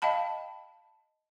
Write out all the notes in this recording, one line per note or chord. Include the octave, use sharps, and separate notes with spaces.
D#5 F5 G5 A5 B5